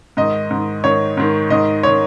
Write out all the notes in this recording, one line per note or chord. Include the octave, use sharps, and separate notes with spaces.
G#2 D#3 D#5
G#2 D#3
G#2 D#3 C#5
G#2 D#3
G#2 D#3 D#5
D#3 C#5